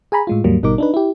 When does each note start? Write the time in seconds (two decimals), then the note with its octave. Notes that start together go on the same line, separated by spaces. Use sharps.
0.12 G#4 G#5 A#5 B5
0.27 A2 G#3 F4
0.44 D#2 G#2 F#3 G3 A#3
0.63 G#1 B2 G3 D#4 A#4 D6
0.78 D4 D#4 B4
0.94 E4 G4